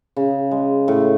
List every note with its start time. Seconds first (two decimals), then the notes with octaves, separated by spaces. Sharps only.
0.17 C#3
0.51 G#3
0.88 A2